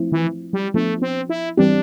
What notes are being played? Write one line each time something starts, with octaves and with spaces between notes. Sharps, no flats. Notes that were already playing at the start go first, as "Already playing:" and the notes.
Already playing: F3 A3 C4 E4
E3
G3
F3 A3 B3 D4
C4
E4
E3 G3 C4 D4 G4